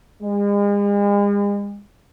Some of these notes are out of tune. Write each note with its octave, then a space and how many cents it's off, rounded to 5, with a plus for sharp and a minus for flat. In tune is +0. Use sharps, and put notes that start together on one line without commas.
G#3 -40